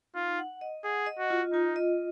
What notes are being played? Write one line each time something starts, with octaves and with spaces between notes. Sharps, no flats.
D#4 F4
F#5
D#5
G#4 F#5
D#5
F#4
F4
D#4 F4
D#5